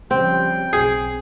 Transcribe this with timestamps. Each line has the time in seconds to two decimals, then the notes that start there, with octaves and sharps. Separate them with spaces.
0.11 C#3 F3 G3 C4 G5
0.73 B1 G#4